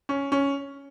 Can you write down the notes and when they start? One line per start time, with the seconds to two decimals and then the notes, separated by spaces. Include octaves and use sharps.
0.09 C#4
0.32 C#4